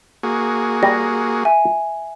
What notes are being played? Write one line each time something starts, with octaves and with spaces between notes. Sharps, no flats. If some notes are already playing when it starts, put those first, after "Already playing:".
A#3 F#4 G#4
G3 A#6
E5 G#5